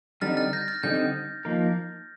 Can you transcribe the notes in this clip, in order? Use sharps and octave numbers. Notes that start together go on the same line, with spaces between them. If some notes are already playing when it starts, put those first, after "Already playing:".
D3 G3 C4 D#4 F6 A6
F6 A6
G6 A#6
F6 A6
D3 G3 C4 D#4 G6
F3 A#3 D#4 A#4